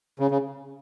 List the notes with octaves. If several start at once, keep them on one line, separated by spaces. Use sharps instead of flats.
C#3
C#3